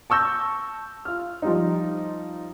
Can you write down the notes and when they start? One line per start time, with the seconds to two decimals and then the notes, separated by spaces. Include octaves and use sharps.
0.10 A5 C#6 E6 G6 A#6
1.05 F4 F6
1.42 F3 G3 D#4